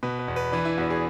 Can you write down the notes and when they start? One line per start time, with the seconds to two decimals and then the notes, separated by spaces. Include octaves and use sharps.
0.03 B2 B4
0.19 B4
0.28 E2
0.36 B4
0.52 E3 D4
0.65 E4
0.78 E2 F#4
0.90 G#4